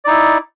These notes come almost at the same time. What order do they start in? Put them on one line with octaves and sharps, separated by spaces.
D5 D#4 E4